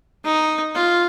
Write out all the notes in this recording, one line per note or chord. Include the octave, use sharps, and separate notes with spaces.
D#4
F4